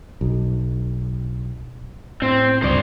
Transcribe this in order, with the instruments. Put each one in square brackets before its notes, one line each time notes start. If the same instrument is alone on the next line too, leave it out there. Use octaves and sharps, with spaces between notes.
[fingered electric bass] B1
[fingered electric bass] A2 [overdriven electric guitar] C4
[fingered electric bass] C#2 G2 [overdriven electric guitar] C5 D5